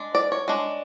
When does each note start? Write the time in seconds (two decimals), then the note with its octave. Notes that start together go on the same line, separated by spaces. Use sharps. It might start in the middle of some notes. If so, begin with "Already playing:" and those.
Already playing: G#3 D4
0.15 D5
0.32 C#5
0.48 G#3 D4